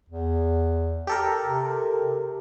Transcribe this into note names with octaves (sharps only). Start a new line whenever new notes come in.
E2
G4 A4 A#4
C3